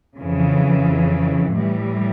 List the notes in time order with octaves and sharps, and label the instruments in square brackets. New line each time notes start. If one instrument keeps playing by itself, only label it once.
[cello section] F2 C#3 E3
A2 E3 G3